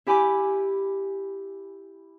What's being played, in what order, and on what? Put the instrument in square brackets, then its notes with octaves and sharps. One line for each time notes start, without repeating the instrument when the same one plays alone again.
[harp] E4 G4 G#5 B5 D6